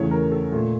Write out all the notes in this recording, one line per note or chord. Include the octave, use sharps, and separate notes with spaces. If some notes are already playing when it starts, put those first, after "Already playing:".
Already playing: E2 C#3 E3 A3 C#5
A#4
A4
A#2 A3